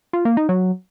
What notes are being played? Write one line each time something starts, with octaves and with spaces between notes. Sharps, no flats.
F4
A#3
D#4
F#3